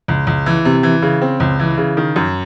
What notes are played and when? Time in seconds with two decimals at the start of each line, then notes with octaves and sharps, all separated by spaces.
0.08 C#2
0.27 C#2
0.46 E3
0.65 C3
0.83 E3
1.02 C#3
1.21 C4
1.40 C#2
1.59 E3
1.78 C#3
1.97 D#3
2.16 F#2